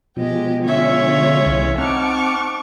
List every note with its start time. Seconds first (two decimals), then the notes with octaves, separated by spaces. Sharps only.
0.17 B2 F3 G#3 G4 D#5
0.65 D3 G#3 C#4 F4 C#5 E5
1.46 C2 E3
1.78 C4 D#4 F#5 A5 C#6 D6 F6